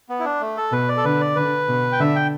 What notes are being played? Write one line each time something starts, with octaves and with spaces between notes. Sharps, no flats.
B3
E4
D4
A3
A4
B2 B4
D5
A4
D3 B4
D5
D3 B4
B2
G5
D3 E5
G5